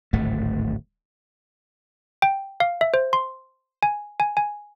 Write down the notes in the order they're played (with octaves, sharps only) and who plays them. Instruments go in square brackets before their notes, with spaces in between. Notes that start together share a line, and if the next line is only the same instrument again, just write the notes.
[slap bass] D1 G#1 A3
[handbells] G5
F5
E5
C5
C6
G#5
G#5
G#5